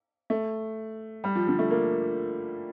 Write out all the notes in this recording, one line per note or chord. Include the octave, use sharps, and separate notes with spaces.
A3
G3
F3
D3
A3
A#3